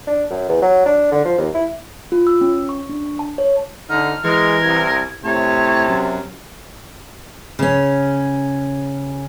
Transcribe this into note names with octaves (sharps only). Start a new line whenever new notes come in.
D4
F#2
E2
F#3
D4
D3
F3
D#2
E4
F4
E6
C#4
C#6
D4
A5
C#5
D3 D#4 F6
E3 G#3 A#4
C2 G#6
A2 C3 C#5 A5
F#2
C#3 C#4